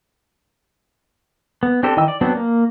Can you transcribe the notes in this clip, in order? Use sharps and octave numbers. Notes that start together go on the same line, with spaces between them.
B3
C4 D4 G4 A4 C5
D#3 E3 D#5 G5 E6
D5
F#3 B3 C4 D4
A#3